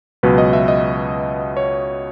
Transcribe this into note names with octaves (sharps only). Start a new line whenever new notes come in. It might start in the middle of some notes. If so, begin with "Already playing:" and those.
C#2 B2 F#3 B4
D#5
E5
D#5
C#5